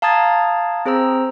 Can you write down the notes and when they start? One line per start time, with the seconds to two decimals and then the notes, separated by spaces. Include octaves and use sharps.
0.02 F5 A5 A#5 D#6 G#6 A6
0.85 C4 G#4 C5 A#5 E6